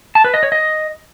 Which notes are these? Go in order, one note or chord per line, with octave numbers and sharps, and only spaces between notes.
A5
B4
D#5
C#5
D#5